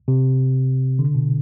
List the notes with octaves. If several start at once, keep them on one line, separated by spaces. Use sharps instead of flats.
C3
D3
B2